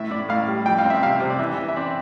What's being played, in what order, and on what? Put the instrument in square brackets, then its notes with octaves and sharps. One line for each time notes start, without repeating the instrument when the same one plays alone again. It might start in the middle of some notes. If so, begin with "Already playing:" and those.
Already playing: [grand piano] A2 [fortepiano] E5
[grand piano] A2 [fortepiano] D5
[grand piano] A2 [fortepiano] F5
[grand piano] G3
[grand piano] F2 [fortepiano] G5
[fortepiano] F5
[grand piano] C4
[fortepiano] E5
[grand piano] C3 [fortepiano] F5
[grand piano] C3 [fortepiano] C5
[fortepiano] D5
[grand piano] E3 [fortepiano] E5
[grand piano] E3
[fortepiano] E5
[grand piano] C4 [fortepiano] D5